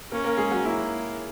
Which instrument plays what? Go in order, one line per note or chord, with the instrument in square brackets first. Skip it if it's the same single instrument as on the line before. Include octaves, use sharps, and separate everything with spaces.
[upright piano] A#3 A#4 [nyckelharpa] C#4
[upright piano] A#3 A#4
G#3 G#4
F#3 F#4
[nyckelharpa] A#3 [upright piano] E4